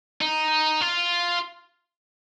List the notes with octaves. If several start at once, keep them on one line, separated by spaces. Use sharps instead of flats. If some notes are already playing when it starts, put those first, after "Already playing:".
D#4
F4